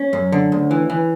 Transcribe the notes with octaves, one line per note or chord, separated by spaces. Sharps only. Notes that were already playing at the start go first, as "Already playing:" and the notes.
Already playing: C#4
F#2
D3
D2
E3
E3